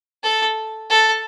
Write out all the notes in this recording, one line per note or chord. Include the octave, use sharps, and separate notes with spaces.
A4
A4